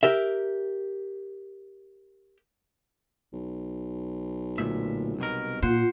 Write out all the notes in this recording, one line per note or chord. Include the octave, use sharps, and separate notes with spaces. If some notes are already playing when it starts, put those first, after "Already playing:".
G4 A#4 E5
B1
D2 A#2 E5
C2 B2 A#4
A#2 F4 C5 F#5